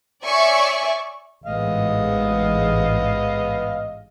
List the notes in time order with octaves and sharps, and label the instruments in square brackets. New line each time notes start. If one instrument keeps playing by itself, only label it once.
[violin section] C#5 D5 E5 G#5 C#6
[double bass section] A1 G#2 G#3 [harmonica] B3 D#5 F5